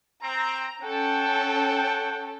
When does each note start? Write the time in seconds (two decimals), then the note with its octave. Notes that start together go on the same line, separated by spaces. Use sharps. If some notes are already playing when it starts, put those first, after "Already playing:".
0.23 C4 A#5
0.82 C#4 A4 F#5 G5